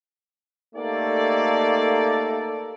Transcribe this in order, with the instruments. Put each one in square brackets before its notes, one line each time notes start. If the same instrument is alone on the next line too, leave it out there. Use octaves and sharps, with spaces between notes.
[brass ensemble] A3 A#3 D#4 G4 A4 D5